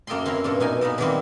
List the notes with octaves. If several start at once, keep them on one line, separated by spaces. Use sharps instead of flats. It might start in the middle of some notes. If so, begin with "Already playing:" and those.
F#2 A#3 A4 D#5 G5 C6
C4 C#4 E4 C5 A#5
G2 A#2 A4
F#2 B2 D#4 A#4 G#5
A#2 B3 D#4 A4
D#3 E3 F#3 G3 A#3 C4